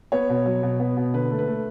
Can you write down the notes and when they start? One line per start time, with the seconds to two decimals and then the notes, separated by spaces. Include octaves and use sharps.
0.12 B3 C#5
0.30 B2
0.46 F#3
0.63 B2
0.80 B3
0.97 B2
1.14 D3 B4
1.31 A3
1.39 B4
1.48 A3